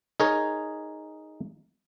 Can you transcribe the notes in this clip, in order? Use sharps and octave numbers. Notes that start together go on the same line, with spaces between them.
D#4 G#4 A#4 C#5